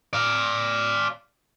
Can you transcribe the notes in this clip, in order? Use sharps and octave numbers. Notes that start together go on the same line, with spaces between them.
D5 F5